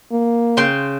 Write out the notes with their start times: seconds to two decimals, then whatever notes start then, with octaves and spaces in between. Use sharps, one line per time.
0.12 A#3
0.57 C#3 G5 C6